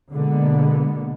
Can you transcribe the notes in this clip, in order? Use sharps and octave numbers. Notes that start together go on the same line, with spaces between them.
B2 D3 G#3 A#3 B3